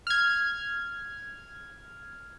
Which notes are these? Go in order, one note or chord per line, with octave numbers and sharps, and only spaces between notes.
F6 G#6